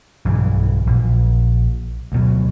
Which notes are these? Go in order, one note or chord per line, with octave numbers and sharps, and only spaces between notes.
B1 G2 C#3 E3
A#1
D2 B2 F#3